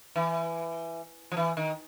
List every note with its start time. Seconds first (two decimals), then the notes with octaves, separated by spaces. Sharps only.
0.16 E3
1.32 F3
1.37 E3
1.57 D#3